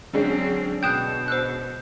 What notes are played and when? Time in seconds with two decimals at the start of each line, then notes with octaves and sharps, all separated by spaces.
0.13 D3 F#3 G#3 C4 C#4
0.83 B2 G5 D#6 F#6 G6 E7
1.28 C5 E6 F#6